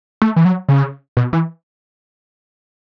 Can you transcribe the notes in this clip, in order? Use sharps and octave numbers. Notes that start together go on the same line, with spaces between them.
A3
E3
F#3
C#3
B2
E3